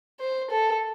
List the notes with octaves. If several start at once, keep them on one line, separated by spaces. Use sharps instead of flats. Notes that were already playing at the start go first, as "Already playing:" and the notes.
C5
A4